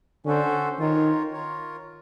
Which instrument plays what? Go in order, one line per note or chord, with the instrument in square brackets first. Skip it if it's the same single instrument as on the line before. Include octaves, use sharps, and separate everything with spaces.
[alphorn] D3 [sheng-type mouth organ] C#4 F#4 A4 C5
[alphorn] D#3 [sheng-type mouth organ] F4 A#4 C#5
[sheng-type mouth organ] F4 A#4 C#5